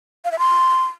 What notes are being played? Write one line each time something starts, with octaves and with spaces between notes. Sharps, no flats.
F5
E5
C6